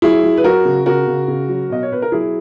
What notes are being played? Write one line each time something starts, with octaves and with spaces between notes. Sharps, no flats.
F#3 E4 G#4
F#3
B4
F#3 F#4 A#4
C#3
C#3 F#4 A#4
C#3
C#3
F#3
B2 D#5
C#5
B2 B4
A#4
F#3 E4 G#4